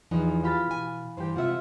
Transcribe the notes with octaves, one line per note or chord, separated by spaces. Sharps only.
E2 F3 D#4
F3 F4 G4 F5 B5 A6
B2 G#5
G2 E3 G4 C5
C3 G#3 F4 E5 F#5